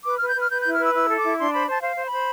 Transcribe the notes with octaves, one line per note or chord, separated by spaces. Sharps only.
B4 D6
B4 F6
G6
B4 F6
B4 G6
E4 G6
F6
B4 E6
E4 E6
A4
D6
E4
D4 C6
C5 B5
C5 A5
C5 F5
C5
B5
C5